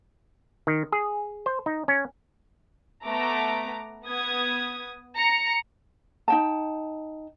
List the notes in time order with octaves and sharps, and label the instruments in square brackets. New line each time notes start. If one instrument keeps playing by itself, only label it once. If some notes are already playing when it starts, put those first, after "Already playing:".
[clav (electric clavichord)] D#3
G#4
C5
D#4
C#4
[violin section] A3 B3 A#5 D6
B3 D#6 G#6
A#5 C#7
[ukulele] D#4 G5 A5